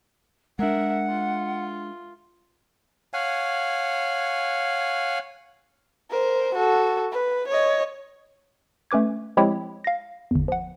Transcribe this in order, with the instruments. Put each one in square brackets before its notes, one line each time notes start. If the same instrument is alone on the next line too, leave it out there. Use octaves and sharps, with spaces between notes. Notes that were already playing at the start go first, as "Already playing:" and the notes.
[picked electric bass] G#3 D4 [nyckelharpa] A#4 E5 [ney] F#5
[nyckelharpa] F4
[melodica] C#5 F5 F#5 G#5
[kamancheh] A#4 C5
F#4 A4
B4
C#5 D#5
[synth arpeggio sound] A3 C#4 B4 D6 G#6
F3 G#3 C4 E4 G4 C#5
F5 A#6
G1 E2
F3 F#5